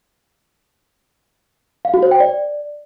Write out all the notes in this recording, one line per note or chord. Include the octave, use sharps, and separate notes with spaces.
F5
F#4
C5
G5
D5